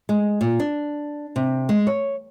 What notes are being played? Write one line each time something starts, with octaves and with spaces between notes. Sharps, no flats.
G#3
A#2
D4
C3
G#3
C#5